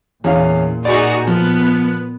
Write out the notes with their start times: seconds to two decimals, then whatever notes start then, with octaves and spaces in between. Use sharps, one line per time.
0.24 E2 A#2 C#4 F5
0.85 D#4 F#4 G#4 D5 C#6
1.27 F3 B3